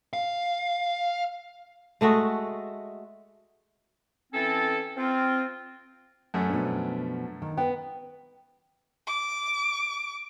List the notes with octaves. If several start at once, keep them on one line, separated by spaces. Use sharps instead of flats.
F5
G#3 A3 F#4 D#5
E3 C4 C#4 A4
C4 F4
F#2 A3 C#4
B2 F3 D4
D#3
B3 G5
D6